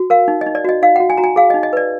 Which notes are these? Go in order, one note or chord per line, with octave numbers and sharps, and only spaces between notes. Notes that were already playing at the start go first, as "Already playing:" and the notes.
Already playing: F#4
A#4 F5
D#4
D#5
D#4
D5
F#4 D#5
D#4 F5
F#4 F#5
G#5
F#4 A#5
G#5
G#4 F5
D#4 D#5
D#5
B4 D5